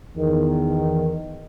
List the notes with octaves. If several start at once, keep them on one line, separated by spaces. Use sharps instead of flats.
E2 D#3